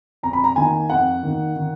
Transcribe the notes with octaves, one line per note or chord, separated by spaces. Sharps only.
F2 A#5
B5
A#5
D#3 A#3 D#4 G#5
F2 F#5
D#3 A#3 D#4
D#3